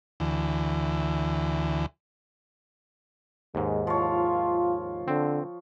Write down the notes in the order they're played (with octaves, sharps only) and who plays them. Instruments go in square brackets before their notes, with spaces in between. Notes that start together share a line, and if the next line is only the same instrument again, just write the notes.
[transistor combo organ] D2 E3
[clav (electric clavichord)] D#2 G#2 [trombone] G#3
[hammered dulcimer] F3 C#5 [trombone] F4
[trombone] D3 [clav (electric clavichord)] C4